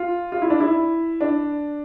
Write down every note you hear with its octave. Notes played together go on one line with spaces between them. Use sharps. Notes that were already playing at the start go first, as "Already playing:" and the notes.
Already playing: F4
F4
E4
D4
E4
D4